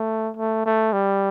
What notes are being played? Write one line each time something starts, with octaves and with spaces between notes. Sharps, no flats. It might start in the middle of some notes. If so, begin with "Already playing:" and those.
Already playing: A3
A3
A3
G3